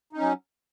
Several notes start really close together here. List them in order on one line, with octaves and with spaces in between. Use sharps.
D#4 C#4 F#3